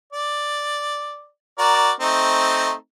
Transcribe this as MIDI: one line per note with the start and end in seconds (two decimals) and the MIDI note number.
0.13 1.28 74
1.59 1.91 66
1.59 1.91 70
1.59 1.91 74
2.00 2.73 57
2.00 2.73 60
2.00 2.73 63